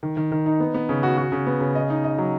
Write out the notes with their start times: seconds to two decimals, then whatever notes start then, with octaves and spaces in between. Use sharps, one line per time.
0.03 D#3
0.17 D#3
0.32 D#3
0.46 D#4
0.60 B3
0.74 B3
0.89 C#3
1.03 F#4
1.17 F#4
1.32 C#3
1.47 B3
1.61 C#3
1.75 D#5
1.90 D#4
2.04 D#5
2.18 F#3